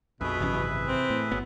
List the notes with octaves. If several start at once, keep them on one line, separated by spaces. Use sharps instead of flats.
A#1 F2 B2 G#4 B4 E5
G#1 F#2 C3 E3 C#4
C3 E3
C4
A2
G1 F#3 B3